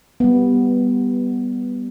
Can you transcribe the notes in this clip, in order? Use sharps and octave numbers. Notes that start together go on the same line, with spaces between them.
G3 B3